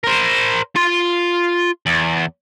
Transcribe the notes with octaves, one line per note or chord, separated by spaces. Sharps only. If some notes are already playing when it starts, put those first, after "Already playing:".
A#4 C5
F4 C6
E2